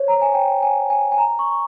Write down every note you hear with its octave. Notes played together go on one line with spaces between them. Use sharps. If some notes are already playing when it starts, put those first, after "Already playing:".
Already playing: C5 C#5
A#5
G#5
G5
G#5
G#5
G#5
A#5
C#6